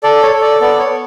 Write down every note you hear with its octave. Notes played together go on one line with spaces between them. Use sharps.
A4 D5
C#5
A4
D5
B3 D5
C#5
B3